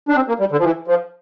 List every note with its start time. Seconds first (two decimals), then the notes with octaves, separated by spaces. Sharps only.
0.09 D4
0.16 C4
0.28 A#3
0.40 G3
0.52 D3
0.59 F3
0.64 E3
0.88 F3